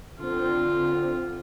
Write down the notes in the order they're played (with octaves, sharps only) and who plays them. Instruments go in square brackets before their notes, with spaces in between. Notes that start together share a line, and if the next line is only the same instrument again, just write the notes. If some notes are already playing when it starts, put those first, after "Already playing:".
[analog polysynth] D3 C4 [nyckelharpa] F4